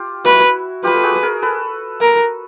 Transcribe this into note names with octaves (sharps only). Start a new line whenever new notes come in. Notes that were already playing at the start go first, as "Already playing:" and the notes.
Already playing: F4 G4
E4 F#4 B4
F4 G4 B4
A4
F#4 G#4
G#4 A#4
A4 B4
A#4